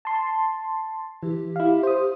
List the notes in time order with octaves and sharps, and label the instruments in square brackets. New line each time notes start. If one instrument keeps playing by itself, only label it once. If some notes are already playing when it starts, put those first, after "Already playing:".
[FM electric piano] A5 C6
[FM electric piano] E3 [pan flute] G4
[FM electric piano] E4 F5
C5 D#6